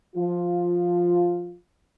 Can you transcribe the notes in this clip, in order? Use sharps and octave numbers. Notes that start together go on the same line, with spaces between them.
F3 F4